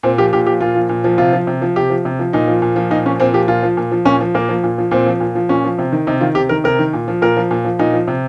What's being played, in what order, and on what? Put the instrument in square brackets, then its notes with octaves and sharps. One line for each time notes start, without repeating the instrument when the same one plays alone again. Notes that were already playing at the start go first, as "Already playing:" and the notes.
[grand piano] A#2 C4
F3 G4
A#2 G4
F3 G4
A#2 F4
F3
A#2
F3
C3 F4
F3
C3
F3
C3 G4
F3
C3
F3
A#2 D#4
F3
A#2
F3
A#2 D#4
F3 C#4
A#2 C4
F3 G4
A#2 F4
F3
A#2
F3
A#2 C#4
F3
A#2 A#3
F3
A#2
F3
A#2 C4
F3
A#2
F3
A#2 C#4
F3
C3
D#3
C3 D#4
D#3 F4
C3 G4
D#3 A#4
C3 A#4
D#3
A#2
F3
A#2 A#4
F3
A#2
F3
A#2 D#4
F3
C3